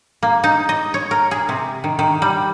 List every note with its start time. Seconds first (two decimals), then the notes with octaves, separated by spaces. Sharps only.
0.23 A#3
0.44 D#4
0.69 D#5
0.94 C#5
1.11 A#4
1.31 G#4
1.49 C3
1.84 D#3
1.99 D#3
2.22 G3